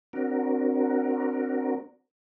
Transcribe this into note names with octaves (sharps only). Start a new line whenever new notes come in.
C4 D4 F#4 A#4